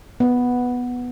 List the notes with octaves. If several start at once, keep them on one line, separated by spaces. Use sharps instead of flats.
B3